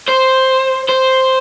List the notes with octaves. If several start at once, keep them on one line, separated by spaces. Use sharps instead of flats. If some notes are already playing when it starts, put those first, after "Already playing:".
C5
C5